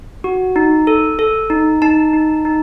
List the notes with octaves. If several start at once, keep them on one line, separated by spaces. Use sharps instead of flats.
F#4
D#4
A4
A4
D#4
D#4 A5
D#4
D#4